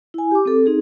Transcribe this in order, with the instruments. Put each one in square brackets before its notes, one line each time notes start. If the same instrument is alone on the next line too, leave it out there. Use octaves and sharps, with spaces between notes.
[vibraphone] E4 G#5
G4 D6
C4 A4
C4 D#4 G#4